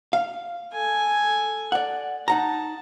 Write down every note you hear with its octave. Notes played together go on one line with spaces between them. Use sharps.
F5
A4 G#5
D5 F#5
D#4 F#5 A5 A#5